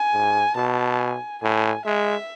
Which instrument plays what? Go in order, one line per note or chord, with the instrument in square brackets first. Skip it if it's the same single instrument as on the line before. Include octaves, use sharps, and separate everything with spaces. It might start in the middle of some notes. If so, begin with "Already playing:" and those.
Already playing: [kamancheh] G#5
[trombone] G#2
[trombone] B2 [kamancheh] A5
[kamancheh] G#5
[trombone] A2 [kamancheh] G#5
[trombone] G#3 [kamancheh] E5